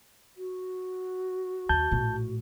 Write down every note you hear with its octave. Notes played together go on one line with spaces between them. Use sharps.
F#4
D#2 A5 G6
A#1 A2